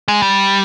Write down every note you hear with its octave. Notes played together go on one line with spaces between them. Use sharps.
G#3
G3